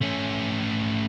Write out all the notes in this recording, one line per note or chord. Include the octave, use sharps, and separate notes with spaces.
A3 C#4